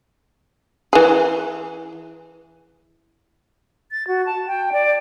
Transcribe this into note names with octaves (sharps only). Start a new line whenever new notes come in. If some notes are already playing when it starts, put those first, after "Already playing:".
E3 G#4
A6
F#4
A5
G5
D5